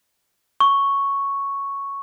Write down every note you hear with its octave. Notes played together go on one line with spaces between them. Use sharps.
C#6